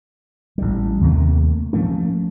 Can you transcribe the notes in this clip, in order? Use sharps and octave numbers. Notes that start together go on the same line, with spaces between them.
A1 G3
D#2 C3 D#3 A3
F3 A3 A#3 C#4